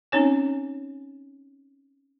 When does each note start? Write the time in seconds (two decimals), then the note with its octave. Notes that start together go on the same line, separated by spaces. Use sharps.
0.12 C4 C#4 D#4 C#5 G#5